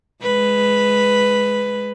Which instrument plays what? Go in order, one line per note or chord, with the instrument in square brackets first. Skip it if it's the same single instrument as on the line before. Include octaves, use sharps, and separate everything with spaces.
[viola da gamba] G#3 B4